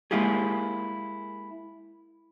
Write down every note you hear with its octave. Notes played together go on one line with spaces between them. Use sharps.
G#3 A#3 E4 F4 G4 G#4